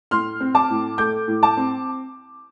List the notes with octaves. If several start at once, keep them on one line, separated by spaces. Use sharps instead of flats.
A2 C6 F6
C4
A5 D6
A2
A3 D6 G6
A2
A5 D6
C4